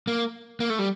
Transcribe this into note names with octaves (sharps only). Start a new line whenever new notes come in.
A#3
A#3
A3
G3